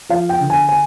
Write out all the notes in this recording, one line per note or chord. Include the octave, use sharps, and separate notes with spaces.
F3 F5
G5
D3
G#5
G#5